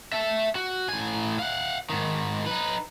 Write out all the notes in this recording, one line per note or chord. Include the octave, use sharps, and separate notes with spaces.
E5 A5
F#4
A2 G#5
F5 F#5
G#2 D#3
D#4 B4